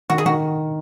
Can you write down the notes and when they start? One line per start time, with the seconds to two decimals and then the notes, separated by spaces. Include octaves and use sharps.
0.10 D#3 F#4
0.18 G#4
0.26 D#3 F#4